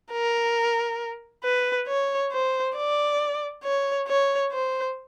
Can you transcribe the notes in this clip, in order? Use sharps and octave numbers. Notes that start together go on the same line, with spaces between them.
A#4
B4
C#5
C5
D5
C#5
C#5
C5